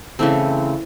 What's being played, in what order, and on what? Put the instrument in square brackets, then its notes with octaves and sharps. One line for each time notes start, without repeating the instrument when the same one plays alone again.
[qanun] C#3 E3 A3 C4